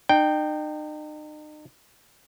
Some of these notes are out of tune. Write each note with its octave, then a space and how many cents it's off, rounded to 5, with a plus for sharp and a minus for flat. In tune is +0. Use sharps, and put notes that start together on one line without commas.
D#4 -40 G5 +0